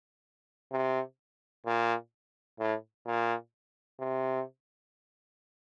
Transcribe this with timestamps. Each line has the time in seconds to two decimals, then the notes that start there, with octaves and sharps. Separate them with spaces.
0.72 C3
1.66 A#2
2.59 A2
3.06 A#2
4.00 C3